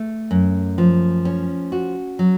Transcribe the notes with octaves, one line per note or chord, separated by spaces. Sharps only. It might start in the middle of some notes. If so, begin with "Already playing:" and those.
Already playing: A3
F#2
F3
C#4
F#4
F#3